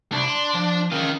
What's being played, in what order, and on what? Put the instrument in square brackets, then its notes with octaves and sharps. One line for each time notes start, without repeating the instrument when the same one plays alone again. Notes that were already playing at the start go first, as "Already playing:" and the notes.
[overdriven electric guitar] C2 [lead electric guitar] D4
[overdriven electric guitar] C6
F3
[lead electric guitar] D#3 [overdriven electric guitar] C#4 F4